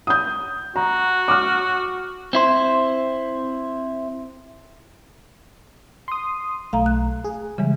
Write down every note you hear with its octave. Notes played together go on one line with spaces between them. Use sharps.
D#6 G6
F#4 A#5
D6 F6
C4 E4 C5
C6 D#6
B1 A3 F5 A#5
F#6
G#4
C#3 E3 G3 G#3